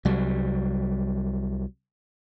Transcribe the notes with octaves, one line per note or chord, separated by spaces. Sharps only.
C2 F#3 G3